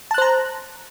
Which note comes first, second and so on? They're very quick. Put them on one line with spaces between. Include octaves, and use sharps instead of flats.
A5 F#6 C5 A#5